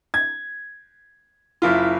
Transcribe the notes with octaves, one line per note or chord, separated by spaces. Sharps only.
G#6
F#1 E4 F4